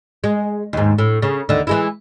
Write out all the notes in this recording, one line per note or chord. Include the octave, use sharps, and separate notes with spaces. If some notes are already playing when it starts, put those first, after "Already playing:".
G#3
D#2 G#2
A2
C#3
D#2 D3
E3 G#3 E4